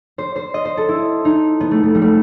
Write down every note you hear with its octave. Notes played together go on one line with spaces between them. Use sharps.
C5
C5
D#5
C5
A4
E4
D#4
B3
A3
A3
G3
A3